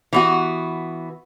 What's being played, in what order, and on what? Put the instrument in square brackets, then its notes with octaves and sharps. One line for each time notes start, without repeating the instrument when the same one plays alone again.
[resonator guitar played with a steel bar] E3 B3 F#4